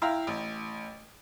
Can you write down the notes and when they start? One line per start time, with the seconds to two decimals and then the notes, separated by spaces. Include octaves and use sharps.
0.02 E4 E5 F5 G5 A#5
0.27 A1